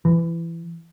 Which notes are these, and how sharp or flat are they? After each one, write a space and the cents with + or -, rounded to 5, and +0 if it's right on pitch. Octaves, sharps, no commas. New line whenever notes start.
E3 +20